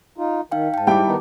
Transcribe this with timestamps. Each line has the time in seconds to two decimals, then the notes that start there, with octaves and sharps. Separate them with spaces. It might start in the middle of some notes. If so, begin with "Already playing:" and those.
0.18 D#4 F4
0.52 D#3 D#4 F5 G5
0.74 G#2 G5 A5
0.87 G3 E4 G4 G5 D6
1.06 D#3 B3 D#4